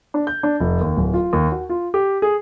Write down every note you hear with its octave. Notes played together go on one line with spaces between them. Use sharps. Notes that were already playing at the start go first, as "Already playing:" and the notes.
D4
G6
D4
F1
D#2
D1
F4
D#2
F#4
F4
G4
G#4